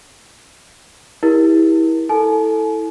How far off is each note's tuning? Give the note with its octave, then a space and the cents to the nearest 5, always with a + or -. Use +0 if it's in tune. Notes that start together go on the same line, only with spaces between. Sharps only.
E4 -20 G4 +25 A#4 +30
E4 -15 A4 +0 G#5 +45